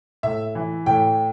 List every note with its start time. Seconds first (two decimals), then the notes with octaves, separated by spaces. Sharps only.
0.23 A2 E5
0.55 E3
0.86 A2 G5